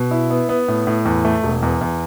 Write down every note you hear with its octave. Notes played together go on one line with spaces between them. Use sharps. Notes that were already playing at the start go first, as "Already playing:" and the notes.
Already playing: B2
E4
B3
B3
A2
A2
E2
A3
E1
E2
E2